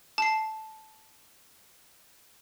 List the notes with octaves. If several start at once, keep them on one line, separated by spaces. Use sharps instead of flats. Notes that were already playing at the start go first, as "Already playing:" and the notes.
A5 C7